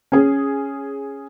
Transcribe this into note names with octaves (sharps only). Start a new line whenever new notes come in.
C#4 G#4